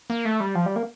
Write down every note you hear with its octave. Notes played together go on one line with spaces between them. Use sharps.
A#3
A3
G3
F3
G3
A#3